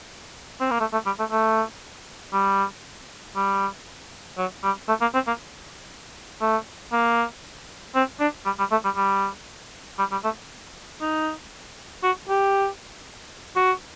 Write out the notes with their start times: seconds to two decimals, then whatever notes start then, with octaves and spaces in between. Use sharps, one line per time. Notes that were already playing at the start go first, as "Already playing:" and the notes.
0.60 C4
0.71 A#3
0.80 A3
0.92 A3
1.06 G3
1.19 A3
1.31 A3
2.33 G3
3.36 G3
4.37 F#3
4.63 G3
4.88 A3
5.01 A#3
5.14 C4
5.27 A#3
6.41 A3
6.92 A#3
7.95 C4
8.20 D4
8.45 G3
8.59 G3
8.71 A3
8.84 G3
8.96 G3
9.99 G3
10.12 G3
10.24 A3
11.01 D#4
12.03 F#4
12.29 G4
13.56 F#4